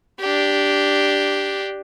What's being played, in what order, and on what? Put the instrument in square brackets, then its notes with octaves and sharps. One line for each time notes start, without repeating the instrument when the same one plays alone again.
[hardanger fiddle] D4 G4